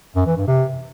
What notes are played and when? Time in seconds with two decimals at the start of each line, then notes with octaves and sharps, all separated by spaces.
0.16 F#2
0.26 E3
0.37 G2
0.47 C3